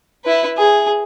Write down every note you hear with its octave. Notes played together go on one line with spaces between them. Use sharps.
E4 B4
G#4